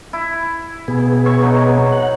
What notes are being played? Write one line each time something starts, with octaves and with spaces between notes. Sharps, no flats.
E4
B2 B3 G#4
C#5 E5 C#6
F#3 D#4
F#5